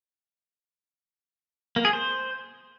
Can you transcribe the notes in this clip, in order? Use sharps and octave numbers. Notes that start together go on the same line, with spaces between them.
A#3
G#4
C5